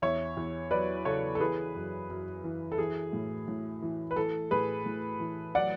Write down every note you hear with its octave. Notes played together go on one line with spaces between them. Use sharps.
E2 C#5 E5
E2
F#3 B4 D5
C#3 A4 C#5
A4
E3 G#4 B4
F#2
F#2
E3
A4
E3 G#4
A2
A2
E3
B4
E3 A4
A2 G#4 B4
A2
E3
F#3 D5 F#5